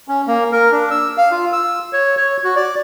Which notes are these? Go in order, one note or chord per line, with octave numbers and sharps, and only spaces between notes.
C#4
A#3
A#4
D4
E6
F5
F4
E6
C#5
C#5
F#4
D5